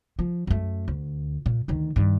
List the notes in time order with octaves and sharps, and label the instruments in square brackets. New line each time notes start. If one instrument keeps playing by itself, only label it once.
[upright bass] F3
F#2 A3
D2
A#2
D2 D#3
G2 D#3